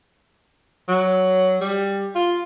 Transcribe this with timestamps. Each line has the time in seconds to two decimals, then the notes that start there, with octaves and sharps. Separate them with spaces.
0.88 F#3
1.61 G3
2.15 F4